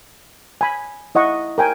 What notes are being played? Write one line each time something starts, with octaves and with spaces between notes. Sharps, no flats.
G#5 B5
E4 D#5 F#5 C#6
A#4 G5 G#5